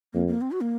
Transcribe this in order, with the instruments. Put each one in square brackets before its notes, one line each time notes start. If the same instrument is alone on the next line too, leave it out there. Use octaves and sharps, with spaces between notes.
[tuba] F2 [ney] A#3
[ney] A#3
C4
F#4
A#3